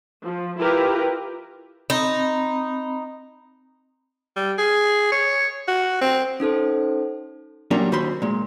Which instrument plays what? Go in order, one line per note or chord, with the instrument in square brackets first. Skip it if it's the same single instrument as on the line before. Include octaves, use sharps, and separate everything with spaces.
[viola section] F3
E4 F4 G4 A#4 B4
[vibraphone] C4 B5 [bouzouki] D#4
[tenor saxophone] G3
G#4
C#5
F#4
C4
[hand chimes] C#4 D#4 A4 C5
[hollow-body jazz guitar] A#2 F#3 G3 C#4 D4 A#4
D#2 F#4 C5 B5 C6
A#2 G#3